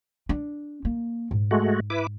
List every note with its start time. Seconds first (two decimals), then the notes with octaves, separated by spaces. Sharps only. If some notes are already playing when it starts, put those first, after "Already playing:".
0.29 D4
0.85 A#3
1.31 G#2
1.51 G#3 A3 F#4
1.90 E4 B4 D6